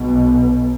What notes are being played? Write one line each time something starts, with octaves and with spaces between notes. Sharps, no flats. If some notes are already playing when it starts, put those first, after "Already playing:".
Already playing: B1 B2